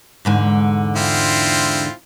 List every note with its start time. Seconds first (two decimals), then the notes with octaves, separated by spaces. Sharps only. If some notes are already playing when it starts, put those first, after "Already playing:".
0.25 E2 G#2 D3
0.96 C4 E4 F4